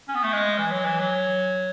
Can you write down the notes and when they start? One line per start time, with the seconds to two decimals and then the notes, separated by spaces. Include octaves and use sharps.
0.08 C#4
0.15 B3
0.23 A3
0.33 G#3
0.58 E3
0.71 F#3
0.85 E3
0.99 F#3